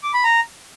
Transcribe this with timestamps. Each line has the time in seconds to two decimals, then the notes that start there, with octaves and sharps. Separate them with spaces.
0.03 D6
0.14 B5
0.24 A#5